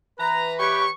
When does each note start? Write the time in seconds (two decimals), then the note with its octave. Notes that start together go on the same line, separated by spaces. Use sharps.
0.19 E3 B4 A#5
0.60 G4 C#5 C#6